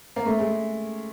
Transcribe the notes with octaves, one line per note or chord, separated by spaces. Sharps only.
A#3
A3
G#3